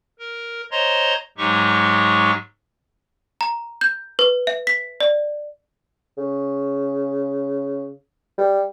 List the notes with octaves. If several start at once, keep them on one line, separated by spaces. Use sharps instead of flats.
A#4
C5 C#5 D#5 A#5 C6
G#2 F#3 G#3 D#4 G4 C#6
A#5
G6
B4
E5
B6
D5
C#3
G3